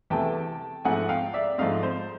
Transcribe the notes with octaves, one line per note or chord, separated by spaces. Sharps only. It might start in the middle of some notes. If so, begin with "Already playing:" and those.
E2 C3 E3 A3 G5 A5
G#2 F3 A3 C4 F#5 G#5
F5 G5
D5 E5
G#2 F3 A3 C4 D#5 F5
C5